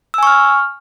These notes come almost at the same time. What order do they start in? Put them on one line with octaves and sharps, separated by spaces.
E6 G#5 C#6 F6